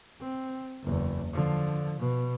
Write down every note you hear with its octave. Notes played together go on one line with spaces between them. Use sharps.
C4
F#1 E2
D3 F3
B2